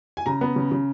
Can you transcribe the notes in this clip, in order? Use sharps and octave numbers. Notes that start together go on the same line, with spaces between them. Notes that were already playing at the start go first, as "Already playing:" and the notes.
G#5
C#3 A#5
B3
C#3
C#3